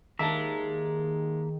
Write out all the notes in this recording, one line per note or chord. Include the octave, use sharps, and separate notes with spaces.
D#2 D#3 G#3 A#3 E5 A5 A#5